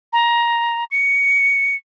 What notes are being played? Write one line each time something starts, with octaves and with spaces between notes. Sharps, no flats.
A#5
C#7